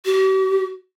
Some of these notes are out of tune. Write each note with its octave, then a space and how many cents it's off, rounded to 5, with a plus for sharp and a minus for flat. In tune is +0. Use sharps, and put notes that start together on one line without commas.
G4 -45